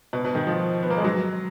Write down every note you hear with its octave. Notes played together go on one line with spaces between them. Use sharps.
B2
B2
D#3
F3
B3
A#3
G#3
F#3